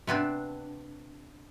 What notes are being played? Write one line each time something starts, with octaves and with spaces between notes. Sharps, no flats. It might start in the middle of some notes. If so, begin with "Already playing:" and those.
C3 B3 C4 D4